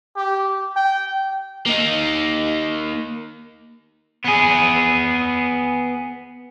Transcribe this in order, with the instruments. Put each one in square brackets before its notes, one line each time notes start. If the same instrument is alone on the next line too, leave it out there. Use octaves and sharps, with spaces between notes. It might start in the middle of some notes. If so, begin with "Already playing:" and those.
[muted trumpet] G4
G5
[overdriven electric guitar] A#3 D#4
B3 G#4